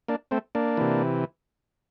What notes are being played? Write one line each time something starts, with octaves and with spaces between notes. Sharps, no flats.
A#3 D4
A3 C4
A#3 D4
C3 E3